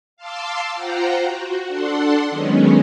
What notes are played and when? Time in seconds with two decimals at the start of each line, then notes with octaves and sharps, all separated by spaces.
0.17 F5 A5 C6 D6 E6
0.75 F4 C5 F#5 G5 A#5
1.24 F#4
1.68 D4 A4 F#5 C6
2.30 D#3 F#3 G#3 B3 C#4